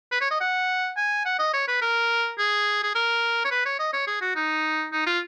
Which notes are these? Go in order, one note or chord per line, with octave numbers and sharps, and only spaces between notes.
B4
C#5
D#5
F#5
G#5
F#5
D#5
C#5
B4
A#4
G#4
G#4
A#4
C#5
B4
C#5
D#5
C#5
G#4
F#4
D#4
D#4
F4